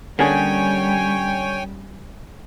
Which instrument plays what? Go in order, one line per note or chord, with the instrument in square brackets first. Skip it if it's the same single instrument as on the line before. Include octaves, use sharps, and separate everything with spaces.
[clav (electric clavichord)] D3 [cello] G3 [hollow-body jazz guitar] A#3 C#4 G#4 [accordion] C#5 G5 G#5